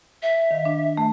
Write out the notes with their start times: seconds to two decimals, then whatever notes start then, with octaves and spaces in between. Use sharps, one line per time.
0.22 E5
0.51 D#3 F5
0.65 D4
0.97 A3